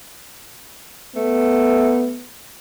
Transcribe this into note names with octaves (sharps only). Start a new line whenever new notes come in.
A3 B3